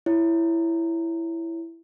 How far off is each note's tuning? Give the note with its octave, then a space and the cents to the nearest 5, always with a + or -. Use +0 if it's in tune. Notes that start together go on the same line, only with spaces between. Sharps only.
E4 +10 C#5 +0